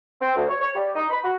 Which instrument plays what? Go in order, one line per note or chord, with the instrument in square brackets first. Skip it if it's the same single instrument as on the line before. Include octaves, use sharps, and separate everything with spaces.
[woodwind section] C4
D2
C#5
C#5
G3
D#4
B5
F#4